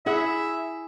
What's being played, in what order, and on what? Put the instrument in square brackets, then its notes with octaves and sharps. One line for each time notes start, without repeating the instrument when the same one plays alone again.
[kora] E4 G#4 F#5 [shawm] E5